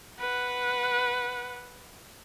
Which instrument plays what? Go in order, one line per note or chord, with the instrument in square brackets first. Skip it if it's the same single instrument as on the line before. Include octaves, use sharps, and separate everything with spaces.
[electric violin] B4 F#5